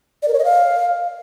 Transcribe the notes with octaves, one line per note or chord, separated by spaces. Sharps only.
D5
A#4
C#5
D#5
F5